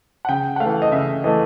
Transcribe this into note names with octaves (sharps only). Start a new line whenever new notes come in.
F#5
C#3 G5
F#5
A3 F5
E3
D#5
C#3 E5
E3 A3 D#5